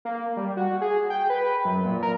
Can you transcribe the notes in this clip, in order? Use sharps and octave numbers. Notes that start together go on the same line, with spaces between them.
A#3
G3
F#4
G#4
G5
B4
F#2
A#2
A#4